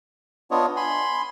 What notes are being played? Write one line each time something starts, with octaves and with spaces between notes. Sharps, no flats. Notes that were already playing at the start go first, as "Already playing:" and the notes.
B3 D4 F4 C#5 D#5
G#5 B5 C6